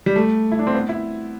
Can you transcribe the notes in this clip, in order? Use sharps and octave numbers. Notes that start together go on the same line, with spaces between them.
G3
A3
E4
D4
C4
B3
E4